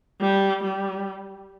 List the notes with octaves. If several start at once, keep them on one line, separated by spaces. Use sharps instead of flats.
G3
G3